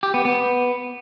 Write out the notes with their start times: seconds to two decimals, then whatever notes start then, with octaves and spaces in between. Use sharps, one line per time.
0.03 G4
0.14 B3
0.25 B3